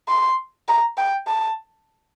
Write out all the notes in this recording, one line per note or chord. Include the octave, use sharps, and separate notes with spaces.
C6
A#5
G5
A5